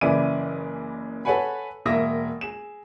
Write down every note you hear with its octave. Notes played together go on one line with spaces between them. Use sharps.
F#1 C#3 E3 E4 D5 D#7
A4 B4 C#5 F#5 G#5 B5
E1 A#3 E5 D#6 A#6
G#4 E7